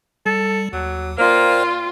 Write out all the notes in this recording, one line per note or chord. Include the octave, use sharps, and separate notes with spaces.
G3 A4
D#2 F#3
A#3 F4 C5 D5 G5